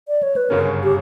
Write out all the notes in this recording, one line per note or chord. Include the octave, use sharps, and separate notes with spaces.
D5
C#5
B4
G1 F#2 C#3 F#3 C#4 A#4
G4